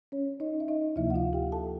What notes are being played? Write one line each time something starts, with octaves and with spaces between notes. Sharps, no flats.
C#4 C#5
D#4 D#5
E5
D#4 D#5
D2 C3 F3 A#3 E4 E5
F#5
F4 F5
G4 G5
A4 A5